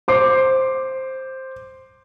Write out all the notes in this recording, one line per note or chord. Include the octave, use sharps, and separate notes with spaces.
C5 D6 C7